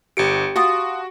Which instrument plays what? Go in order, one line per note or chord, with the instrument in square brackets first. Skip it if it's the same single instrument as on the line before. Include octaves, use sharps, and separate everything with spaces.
[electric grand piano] G1 C#7 D7 [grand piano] G4
[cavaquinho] F4 A5 D#6 [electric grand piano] F#4